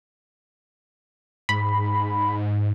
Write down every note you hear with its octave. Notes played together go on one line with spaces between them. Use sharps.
G#2 B5